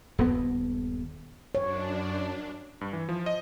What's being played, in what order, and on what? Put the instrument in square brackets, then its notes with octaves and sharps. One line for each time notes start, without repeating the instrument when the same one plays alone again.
[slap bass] D#1 G2 B3
[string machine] F#2 D4 [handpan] C#5
[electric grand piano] G2
E3
F3
D#5